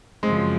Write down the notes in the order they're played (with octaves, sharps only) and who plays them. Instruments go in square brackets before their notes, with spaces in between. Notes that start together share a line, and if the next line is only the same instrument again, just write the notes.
[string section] F#2 C#3 F3 [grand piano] G#3 C4